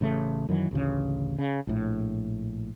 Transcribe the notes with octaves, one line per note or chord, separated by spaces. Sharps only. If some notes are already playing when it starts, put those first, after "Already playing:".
A1 C#3 A3
F#2 D#3 E3 F#3
A1 D2 C#3
C#3
A#1 A2